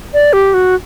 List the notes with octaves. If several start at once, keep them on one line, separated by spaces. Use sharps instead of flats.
D5
G4
F#4